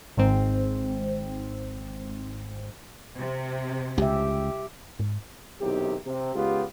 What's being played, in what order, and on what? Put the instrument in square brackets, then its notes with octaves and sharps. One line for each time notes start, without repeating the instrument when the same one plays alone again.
[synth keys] G#1 G#2 C4
[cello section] C3
[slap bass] C#2 [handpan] G4 E5
[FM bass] G#2
[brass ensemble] B1 C3 D#3 E4 G4
C3
C#2 B3 F4 G4